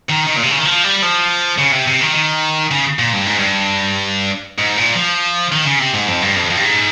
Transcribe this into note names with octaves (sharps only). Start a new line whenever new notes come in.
D#3
D#3
A#2
C3
C#3
D#3
F3
G3
F3
C#3
C3
C3
D#3
D#3
C#3
A#2
G2
G#2
G2
G#2
A#2
F3
D#3
C#3
C3
G#2
F2
G2
F2
F2
G2
G#2